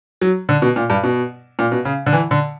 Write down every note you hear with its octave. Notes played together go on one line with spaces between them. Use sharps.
F#3
D3
B2
A#2
G2
B2
A#2
B2
C#3
D3
E3
D3